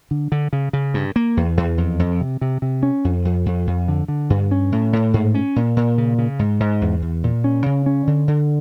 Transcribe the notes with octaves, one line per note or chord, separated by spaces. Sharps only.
D3
D3
C#3
C#3
G2
A#3
E2
E2
F2
F2
C3
C3
C3
C#4
F2
F2
F2
F2
D3
D3
G2
C#4
A2
A2
G#2
C#4
A#2
A#2
C#3
C#3
G#2
G#2
E2
E2
A#2
C#4
C#3
C#4
D3
D3